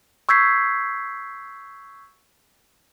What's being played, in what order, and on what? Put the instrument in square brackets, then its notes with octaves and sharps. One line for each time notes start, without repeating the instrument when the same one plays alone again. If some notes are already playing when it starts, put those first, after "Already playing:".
[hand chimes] C#6 E6 G6 G#6 B6 C7